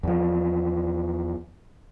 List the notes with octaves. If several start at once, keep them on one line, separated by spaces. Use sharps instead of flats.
E2 F3